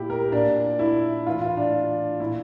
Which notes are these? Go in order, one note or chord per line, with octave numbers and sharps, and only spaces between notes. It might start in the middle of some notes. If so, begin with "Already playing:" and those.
Already playing: A#2 E4 G4
A#4
A#2 D4
E4
A2 E3 F4
F4
D4
A#2 E4